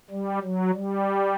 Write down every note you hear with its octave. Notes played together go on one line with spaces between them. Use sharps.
G3
F#3
G3